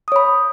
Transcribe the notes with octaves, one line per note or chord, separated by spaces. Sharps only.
C#5 B5 D#6